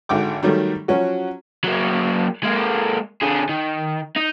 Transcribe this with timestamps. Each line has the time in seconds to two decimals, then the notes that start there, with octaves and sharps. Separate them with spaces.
0.09 G#1 D3 G5 D6
0.43 D#3 F#3 G3 A3
0.88 F3 F#3 C#4 F#4
1.64 F#3 A#3
2.43 G#3 A#3
3.22 D3 G#4
3.50 D#3
4.16 D#4